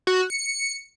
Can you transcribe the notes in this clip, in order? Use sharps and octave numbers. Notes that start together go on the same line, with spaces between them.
F#4
C#7